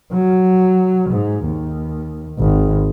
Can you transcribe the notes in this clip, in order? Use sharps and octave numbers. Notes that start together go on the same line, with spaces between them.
F#3
G#2
D#2
G#1